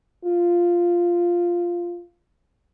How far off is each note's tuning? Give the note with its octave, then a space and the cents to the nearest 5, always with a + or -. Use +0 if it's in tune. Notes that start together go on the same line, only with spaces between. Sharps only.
F4 -5